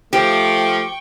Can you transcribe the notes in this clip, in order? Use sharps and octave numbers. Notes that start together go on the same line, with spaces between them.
F3 A3 G4 G5 C#6